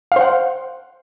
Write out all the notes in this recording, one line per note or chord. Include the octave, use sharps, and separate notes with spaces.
C5 F5 F#5